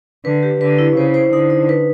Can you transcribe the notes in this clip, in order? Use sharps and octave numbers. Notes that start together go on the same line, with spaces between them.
D3 B4
G4
D3 B4
E4
C#3 C5
C5
D3 D#4
D#4
B4